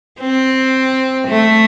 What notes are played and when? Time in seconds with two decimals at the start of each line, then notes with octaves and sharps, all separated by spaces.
0.20 C4
1.28 A3